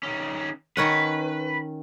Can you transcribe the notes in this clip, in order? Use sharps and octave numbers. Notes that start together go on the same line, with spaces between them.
D#3 C#4
D#3 C#4 B4 F#5